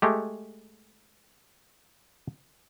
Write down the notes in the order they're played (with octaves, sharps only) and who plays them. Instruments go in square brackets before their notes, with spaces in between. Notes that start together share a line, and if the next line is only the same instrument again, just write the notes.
[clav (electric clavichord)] G#3 A3 G4